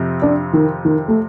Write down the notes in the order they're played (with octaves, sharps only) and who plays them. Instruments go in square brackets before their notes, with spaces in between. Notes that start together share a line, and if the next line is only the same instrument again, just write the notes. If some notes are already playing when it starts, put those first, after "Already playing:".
Already playing: [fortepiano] F2 C3
[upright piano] D4
D#3
D#3
A3